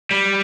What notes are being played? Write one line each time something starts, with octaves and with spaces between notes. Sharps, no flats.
G3